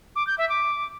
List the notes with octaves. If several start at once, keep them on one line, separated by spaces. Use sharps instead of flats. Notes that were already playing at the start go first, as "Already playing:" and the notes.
D6
G6
E5
D6